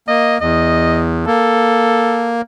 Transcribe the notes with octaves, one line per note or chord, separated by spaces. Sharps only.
A#3 D#5
E2 D#5
A#3 A4